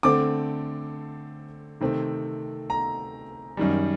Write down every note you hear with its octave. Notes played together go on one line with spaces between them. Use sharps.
D3 A3 C4 D6
C3 D#3 A3 C4
A#5
F#2 D#3 G3